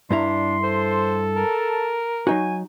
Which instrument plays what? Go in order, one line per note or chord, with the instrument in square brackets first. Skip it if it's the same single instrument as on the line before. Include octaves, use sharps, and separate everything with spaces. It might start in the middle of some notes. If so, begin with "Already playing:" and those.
[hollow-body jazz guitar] G2 E4 A#5 [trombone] D4 [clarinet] C6
[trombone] A4 [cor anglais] C5
[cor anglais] A#4 [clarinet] A5
[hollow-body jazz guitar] F#3 D#4 F#4 [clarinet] G#5